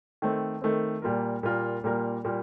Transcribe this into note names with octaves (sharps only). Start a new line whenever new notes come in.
D#3 A3 C4
D#3 A3 C4
A#2 G3 A#3 F4 A#4
A#2 G3 A#3 F4 A#4
A#2 G3 A#3 F4 A#4
A#2 G3 A#3 F4 A#4